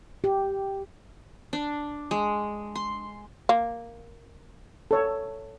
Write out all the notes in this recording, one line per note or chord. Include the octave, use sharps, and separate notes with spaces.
G4
D4
G#3
C6
A#3
A4 C#5